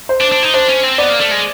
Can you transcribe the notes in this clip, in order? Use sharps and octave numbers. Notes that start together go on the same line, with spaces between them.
C5
D4
D4
D#4
D4 C5
C#4
C4
B3 D5
A#3
A3
G#3